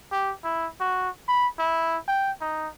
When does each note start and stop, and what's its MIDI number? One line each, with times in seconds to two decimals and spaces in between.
0.12 0.33 67
0.44 0.67 64
0.80 1.10 66
1.28 1.47 83
1.59 1.98 64
2.08 2.31 79
2.41 2.68 63